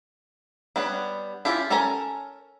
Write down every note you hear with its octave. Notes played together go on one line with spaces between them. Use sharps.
G3 B3 D4 C#5
C#4 E4 F4 G4
C#4 A4 A#4 G#5 A#5